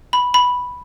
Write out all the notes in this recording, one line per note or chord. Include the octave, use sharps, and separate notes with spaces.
B5
B5